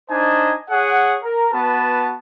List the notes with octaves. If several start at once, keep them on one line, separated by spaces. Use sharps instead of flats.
D4 D#4 C5 D#5 G#5
G#4 C#5 F#5
A#4
B3 F#4 B4 A5